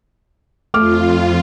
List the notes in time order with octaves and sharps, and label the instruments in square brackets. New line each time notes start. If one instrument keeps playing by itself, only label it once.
[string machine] F2 F4 [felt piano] A3 D6 F6